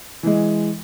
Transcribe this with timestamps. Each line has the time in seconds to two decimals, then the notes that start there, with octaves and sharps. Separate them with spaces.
0.23 E3 G#3